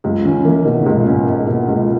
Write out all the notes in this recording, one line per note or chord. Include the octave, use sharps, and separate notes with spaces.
C#2 F#2
D#3 C#4
E3 A#3
B2 D#3
C#3
C#2
A#2
C#4
G#2
G#2 A#3
B2
C#2